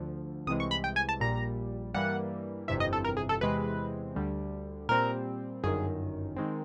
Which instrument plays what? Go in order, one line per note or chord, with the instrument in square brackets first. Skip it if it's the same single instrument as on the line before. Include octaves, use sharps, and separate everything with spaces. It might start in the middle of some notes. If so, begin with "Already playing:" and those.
Already playing: [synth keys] D2 D3 F3
C2 C3 E3 G#3 D#6
C#6
B5
G5
G#5
A5
A#1 A#2 G3 A#5
G2 E3 G3 A#3 F#5
G1 F2 C3 E3 E5
D#5
A4
A#4
G#4
A4
E2 C3 E3 G#3 C4 B4
D2 D3 G3
A#2 G3 C4 A#4
G1 F#2 D#3 G#4
D#3 G#3 C4